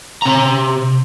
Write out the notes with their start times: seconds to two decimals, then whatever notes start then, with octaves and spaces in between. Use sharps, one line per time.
0.22 C3 A#5